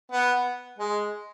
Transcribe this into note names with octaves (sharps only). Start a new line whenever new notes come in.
B3
G#3